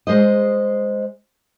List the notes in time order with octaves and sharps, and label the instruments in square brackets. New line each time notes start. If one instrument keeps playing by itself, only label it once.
[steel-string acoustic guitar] G#3 C5 D#5